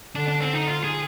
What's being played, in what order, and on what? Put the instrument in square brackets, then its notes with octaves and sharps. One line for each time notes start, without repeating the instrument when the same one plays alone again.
[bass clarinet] D3 [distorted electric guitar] D4
[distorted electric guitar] D4
C4
D#4
F4
G#4